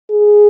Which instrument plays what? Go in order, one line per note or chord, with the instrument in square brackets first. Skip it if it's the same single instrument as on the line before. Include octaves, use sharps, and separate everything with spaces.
[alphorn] G#4